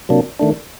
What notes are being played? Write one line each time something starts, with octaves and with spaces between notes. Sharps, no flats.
C3 F#3 A#3 D4
D#3 A3 D4